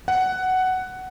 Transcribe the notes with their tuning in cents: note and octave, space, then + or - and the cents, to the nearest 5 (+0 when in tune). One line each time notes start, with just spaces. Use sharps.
F#5 +10